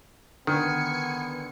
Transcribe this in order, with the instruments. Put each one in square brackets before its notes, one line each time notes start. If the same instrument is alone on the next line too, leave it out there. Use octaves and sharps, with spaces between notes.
[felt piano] D3 [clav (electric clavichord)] D#3 [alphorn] B3 [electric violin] G#5 C#7